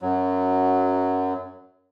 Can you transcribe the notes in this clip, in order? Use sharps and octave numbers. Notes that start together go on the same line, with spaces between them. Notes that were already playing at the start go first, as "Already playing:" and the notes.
F#2 F#3